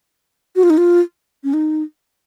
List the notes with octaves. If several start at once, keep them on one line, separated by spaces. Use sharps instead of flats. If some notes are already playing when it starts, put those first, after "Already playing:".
F#4
F4
D#4
F4
C#4
D#4